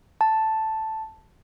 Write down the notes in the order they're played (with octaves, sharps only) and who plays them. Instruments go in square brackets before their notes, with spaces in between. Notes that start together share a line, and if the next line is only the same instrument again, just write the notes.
[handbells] A5